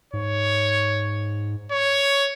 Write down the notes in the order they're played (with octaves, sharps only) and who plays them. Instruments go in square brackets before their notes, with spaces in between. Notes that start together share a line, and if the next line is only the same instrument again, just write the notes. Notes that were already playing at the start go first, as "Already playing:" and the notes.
[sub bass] G#2 [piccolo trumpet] C#5
[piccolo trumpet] C#5